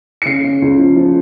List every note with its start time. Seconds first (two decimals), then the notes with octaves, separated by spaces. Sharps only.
0.22 C#7
0.26 C#3 C7
0.44 C#3
0.62 C#2
0.79 F3
0.96 F3